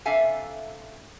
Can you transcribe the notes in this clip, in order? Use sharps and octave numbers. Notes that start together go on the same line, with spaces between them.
C3 D4 A4 E5 F5 G#5